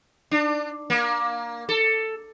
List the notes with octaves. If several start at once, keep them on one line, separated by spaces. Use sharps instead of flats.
D4
A#3
A4